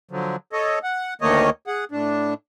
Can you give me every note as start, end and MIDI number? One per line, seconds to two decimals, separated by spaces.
0.11 0.36 50
0.11 0.36 53
0.11 0.36 54
0.52 0.79 69
0.52 0.79 73
0.52 0.79 75
0.83 1.14 78
1.21 1.50 38
1.21 1.50 51
1.21 1.50 57
1.21 1.50 58
1.21 1.50 73
1.21 1.50 75
1.67 1.85 68
1.67 1.85 78
1.91 2.34 45
1.91 2.34 62